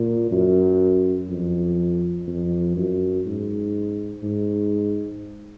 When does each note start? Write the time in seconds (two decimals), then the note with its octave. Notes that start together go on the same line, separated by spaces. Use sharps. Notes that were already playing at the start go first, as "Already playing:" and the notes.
Already playing: A#2
0.31 F#2
1.29 F2
2.27 F2
2.76 F#2
3.26 G#2
4.23 G#2